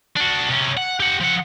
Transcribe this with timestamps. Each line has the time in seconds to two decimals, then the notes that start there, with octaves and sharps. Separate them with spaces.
0.16 D4 F#4
0.49 C3 C#4
0.77 F#5
1.00 G4 F#5
1.20 F3 F#5